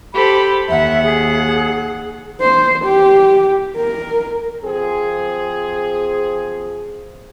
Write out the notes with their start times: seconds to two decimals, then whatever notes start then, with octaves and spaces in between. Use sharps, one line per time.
0.14 G4 A4 C5 B5
0.69 D#2 E5 F#5
1.04 G#4
2.41 C5
2.84 G4
3.76 A#4
4.64 F3 C4 G#4